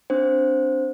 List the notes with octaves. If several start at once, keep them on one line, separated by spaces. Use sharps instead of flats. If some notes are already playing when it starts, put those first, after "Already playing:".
C4 D4 C5